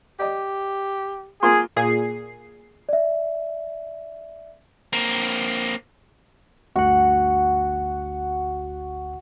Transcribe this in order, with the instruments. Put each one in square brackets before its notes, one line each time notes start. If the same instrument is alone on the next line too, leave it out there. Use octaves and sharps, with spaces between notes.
[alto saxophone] G4 [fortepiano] D5 D#5
[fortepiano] A#3 F4 C6 [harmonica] G#4
[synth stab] A#2 G#4 C7
[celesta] D5 E5
[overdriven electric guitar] A#3 C4
[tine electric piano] G1 D2 F#5 [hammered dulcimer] F#4